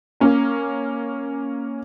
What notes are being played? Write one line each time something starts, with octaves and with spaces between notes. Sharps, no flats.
A#3 C#4 A#4